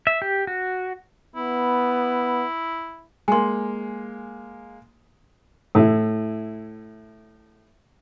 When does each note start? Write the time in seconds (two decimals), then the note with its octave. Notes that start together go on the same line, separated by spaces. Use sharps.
0.07 E5
0.22 G4
0.47 F#4
1.36 B3 E4
3.28 G#3 A#3 G#5 C6
5.75 A2 E4